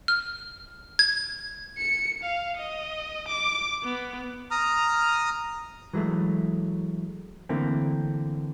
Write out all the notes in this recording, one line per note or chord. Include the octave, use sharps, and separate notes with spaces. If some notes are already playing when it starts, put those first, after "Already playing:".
F6
G#6
C#7
F5
D#5
D6
B3
A#5 D#6 F6
E3 F#3 G#3 A3
D3 E3 A3 A#3 C4